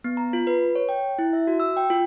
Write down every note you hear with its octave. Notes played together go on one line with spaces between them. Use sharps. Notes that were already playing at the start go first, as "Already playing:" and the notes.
B3
A#5
F4
B4
C#5
G5
E4
E5
F#4
E6
G5
F4